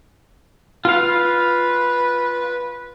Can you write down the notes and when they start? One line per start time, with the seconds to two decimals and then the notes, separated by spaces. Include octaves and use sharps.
0.85 F4 B4 F5